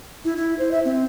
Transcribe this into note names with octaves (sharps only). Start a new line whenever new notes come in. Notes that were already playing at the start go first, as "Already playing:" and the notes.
E4
E4
C5
E5
C4